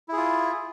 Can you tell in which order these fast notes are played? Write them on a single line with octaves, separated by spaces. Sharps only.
E4 G#4 F4